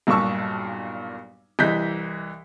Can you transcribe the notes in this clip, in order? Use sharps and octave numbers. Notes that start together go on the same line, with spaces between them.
B1 G2 A#2 A5 C#6 E6
C2 E3 D#5 G6 B6